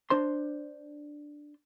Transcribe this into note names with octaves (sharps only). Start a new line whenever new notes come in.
D4 C5 C6